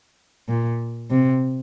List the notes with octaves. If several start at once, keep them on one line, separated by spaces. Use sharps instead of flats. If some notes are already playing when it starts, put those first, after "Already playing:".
A#2
C3